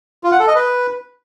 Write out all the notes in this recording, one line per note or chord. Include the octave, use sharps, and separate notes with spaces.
F4
F#5
A4
D#5
B4